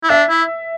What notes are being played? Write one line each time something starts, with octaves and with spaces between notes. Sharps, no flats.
E4
D4 E5
E4